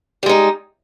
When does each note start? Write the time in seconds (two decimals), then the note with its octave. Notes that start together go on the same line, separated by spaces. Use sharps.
0.23 G3
0.26 G#3
0.29 D#4